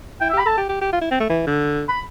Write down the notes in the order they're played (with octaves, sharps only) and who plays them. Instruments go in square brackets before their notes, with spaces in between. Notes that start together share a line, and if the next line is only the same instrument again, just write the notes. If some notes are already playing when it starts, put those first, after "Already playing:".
[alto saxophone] E4 [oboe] G5
[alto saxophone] G4 [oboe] E5
[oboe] B5
[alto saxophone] A4 [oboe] A5
[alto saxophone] G4
G4
G4
F4
E4
C4
A3
E3
D3
[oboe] B5